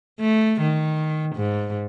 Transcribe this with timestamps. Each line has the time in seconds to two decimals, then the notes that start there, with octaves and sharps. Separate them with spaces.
0.20 A3
0.61 D#3
1.36 G#2